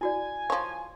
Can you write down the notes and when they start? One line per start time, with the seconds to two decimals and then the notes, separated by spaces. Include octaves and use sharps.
0.01 E4 F#4 D5 G#5
0.50 F3 C#5 F5